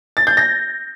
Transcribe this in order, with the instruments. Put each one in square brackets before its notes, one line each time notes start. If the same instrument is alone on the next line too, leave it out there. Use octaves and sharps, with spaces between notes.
[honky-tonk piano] A6
G6
A#6